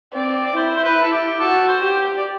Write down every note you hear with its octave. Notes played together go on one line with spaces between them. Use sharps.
C4 D5
D5
E4 C5
C5
B4
A4
G4
F#4 A4
C5
G4
D5